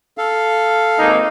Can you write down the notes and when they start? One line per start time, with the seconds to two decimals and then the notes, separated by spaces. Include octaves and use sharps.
0.18 A4 F5
0.98 G#1 A#3 D#4